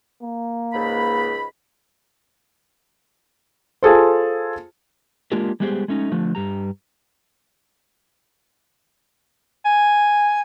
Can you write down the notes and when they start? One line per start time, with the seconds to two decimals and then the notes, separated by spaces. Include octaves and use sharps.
0.22 A#3
0.73 C#2 G#2 B5
3.83 F4 G#4 A4 C5
5.32 G#3 A#3 D4 F4 G4 A#4
5.60 G3 G#3 B3 G4 G#4 C5
5.88 G#3 A3 C#4 D#4
6.12 D3 F3 A3
6.35 G2 G3 A#5
9.65 G#5